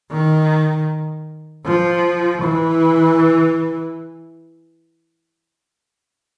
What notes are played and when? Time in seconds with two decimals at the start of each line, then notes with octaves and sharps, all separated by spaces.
0.11 D#3
1.66 F3
2.42 E3